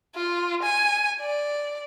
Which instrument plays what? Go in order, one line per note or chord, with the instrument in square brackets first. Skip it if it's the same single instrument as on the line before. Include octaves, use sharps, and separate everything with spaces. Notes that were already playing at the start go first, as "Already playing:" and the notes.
[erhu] F4
G#5
D5